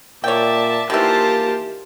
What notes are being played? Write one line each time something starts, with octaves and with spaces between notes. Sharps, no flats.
A#2 C#5 D5 E5 G5 A5
D#3 E3 A#3 F4 G4 C5 A5